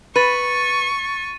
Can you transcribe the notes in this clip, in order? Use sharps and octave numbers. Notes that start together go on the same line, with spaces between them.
B4 C#6 A6 D#7